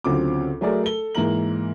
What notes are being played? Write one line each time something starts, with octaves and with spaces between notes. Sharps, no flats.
D2 C#3 F#3 C4 F4 D6
F#3 A3 G#4 A#4 D5
A4 G7
G#2 E3 A#3 A#4 F#7